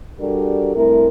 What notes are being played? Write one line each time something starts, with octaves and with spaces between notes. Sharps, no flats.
G3 D4 F#4 G4 A4 A#4
G2 C3 A3 E4 A#4